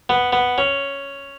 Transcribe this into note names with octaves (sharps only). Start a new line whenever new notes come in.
B3
B3
C#4